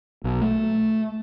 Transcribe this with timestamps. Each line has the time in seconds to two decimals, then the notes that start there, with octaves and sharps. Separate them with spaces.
0.24 B1
0.42 A3